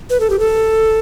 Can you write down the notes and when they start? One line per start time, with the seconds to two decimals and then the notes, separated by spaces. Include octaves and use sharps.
0.10 B4
0.20 A4
0.30 G4
0.39 A4